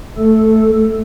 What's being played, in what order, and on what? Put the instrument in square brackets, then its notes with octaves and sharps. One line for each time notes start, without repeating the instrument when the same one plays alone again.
[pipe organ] A3 A4